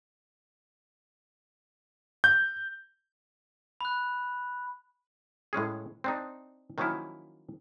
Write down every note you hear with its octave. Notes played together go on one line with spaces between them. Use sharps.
G6
B5 F#6
A2 G#3 C#4 G#4
C4 D4 D#4
D#3 F3 F#3 A#3 C#4 E4